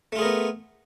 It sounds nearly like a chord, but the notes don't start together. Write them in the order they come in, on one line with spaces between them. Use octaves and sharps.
A3 F4 G#4 A#4 B3